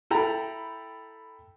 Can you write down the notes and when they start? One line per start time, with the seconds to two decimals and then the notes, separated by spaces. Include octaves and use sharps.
0.11 E4 A4 G5 A#5 B5